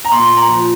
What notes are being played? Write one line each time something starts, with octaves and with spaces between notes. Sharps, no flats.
A#5
A#2 C6
A#5
F3